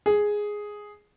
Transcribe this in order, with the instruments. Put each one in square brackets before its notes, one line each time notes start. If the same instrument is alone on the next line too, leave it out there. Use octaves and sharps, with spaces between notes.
[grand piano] G#4